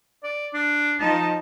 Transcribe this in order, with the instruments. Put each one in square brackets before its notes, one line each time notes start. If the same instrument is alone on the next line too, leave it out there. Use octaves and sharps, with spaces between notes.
[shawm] D5
D4
[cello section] F3 D#4 [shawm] A5